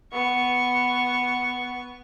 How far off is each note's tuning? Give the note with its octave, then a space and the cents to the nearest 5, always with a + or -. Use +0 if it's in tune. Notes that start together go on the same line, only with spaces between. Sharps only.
B3 +5 C#6 +0